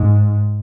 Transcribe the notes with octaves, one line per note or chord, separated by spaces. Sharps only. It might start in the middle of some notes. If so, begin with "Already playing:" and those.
Already playing: G#2